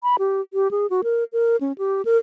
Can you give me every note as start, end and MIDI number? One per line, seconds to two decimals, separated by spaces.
0.03 0.16 83
0.19 0.41 67
0.53 0.71 67
0.71 0.87 68
0.90 1.01 66
1.04 1.24 70
1.33 1.56 70
1.61 1.72 61
1.78 2.02 67
2.05 2.17 70